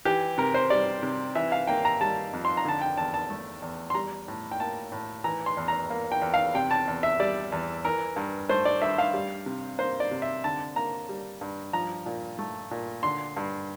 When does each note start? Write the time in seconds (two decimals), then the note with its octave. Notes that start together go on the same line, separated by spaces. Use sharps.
0.05 E3 G4
0.38 C3 A#4
0.54 C5
0.70 G3 D5
1.03 C3
1.35 E3 E5
1.52 F5
1.67 A#3 G5
1.85 A#5
2.01 G3 A5
2.33 F2
2.45 C6
2.57 A#5
2.65 D3 A5
2.81 G5
2.97 E2 A5
3.14 A5
3.30 A3
3.62 E2
3.90 C6
3.95 G3 A#5
4.28 A2
4.52 G5
4.60 A#3 A5
4.92 A2
5.24 E3 A#5
5.46 C6
5.57 E2
5.68 A#5
5.90 A#3
6.12 G5
6.22 E2
6.34 F5
6.54 C3 G5
6.71 A5
6.88 E2
7.03 E5
7.20 G3 D5
7.52 E2
7.85 E3 A#4
8.16 G2
8.49 A3 C5
8.65 D5
8.82 G2 E5
8.98 F5
9.14 G3
9.46 C3
9.79 A#3 C5
10.00 D5
10.11 C3
10.22 E5
10.44 D3 A5
10.76 A#3 A#5
11.09 G3
11.41 G2
11.73 F3 A#5
12.06 A#2
12.39 A3
12.71 A#2
13.03 D3 C6
13.37 G2